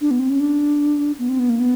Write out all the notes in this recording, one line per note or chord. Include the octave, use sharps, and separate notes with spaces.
D4
B3
C4
C#4
D4
B3
C4
B3
A#3
B3